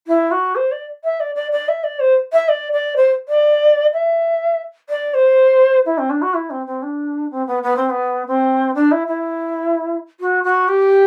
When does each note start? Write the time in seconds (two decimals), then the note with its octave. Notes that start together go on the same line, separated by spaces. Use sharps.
0.07 E4
0.31 F#4
0.55 C5
0.71 D5
1.04 E5
1.20 D5
1.35 D5
1.51 D5
1.68 E5
1.83 D5
1.99 C5
2.32 E5
2.48 D5
2.72 D5
2.96 C5
3.28 D5
3.93 E5
4.89 D5
5.14 C5
5.85 E4
5.98 C4
6.09 D4
6.22 F#4
6.34 E4
6.50 C4
6.66 C4
6.82 D4
7.30 C4
7.46 B3
7.63 B3
7.76 C4
7.89 B3
8.27 C4
8.74 D4
8.91 E4
9.07 E4
10.20 F#4
10.43 F#4
10.68 G4